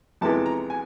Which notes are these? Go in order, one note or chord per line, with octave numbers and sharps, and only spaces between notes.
F2 C3 E3 G#3 B3 A5
A#5
G#5